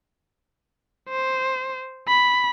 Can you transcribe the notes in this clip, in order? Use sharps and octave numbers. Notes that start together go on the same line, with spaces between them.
C5
B5